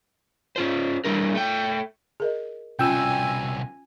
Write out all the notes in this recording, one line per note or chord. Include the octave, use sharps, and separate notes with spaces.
C#4 F4 C5
G3 D4 E4 A#4
A3 G5
G#4 A#4 D#5
C2 B2 C#4 F4 G5 G#5 E6